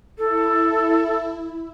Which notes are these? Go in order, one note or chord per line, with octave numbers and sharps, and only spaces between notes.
E4 A4